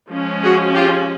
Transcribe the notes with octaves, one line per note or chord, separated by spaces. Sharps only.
F3 G#3 C#4
F#4 G#4
F4 G4